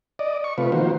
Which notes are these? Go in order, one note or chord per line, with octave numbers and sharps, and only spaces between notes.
D5 D#5
C#6
C3 A3 F4 B4
D#3 F3 A#3 F#4 C5